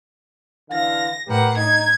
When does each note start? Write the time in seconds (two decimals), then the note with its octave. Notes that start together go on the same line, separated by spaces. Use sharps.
0.70 D3 E3 F5 A#6
1.27 A2 G4 A#4 B4 F#5
1.57 D#4 G#6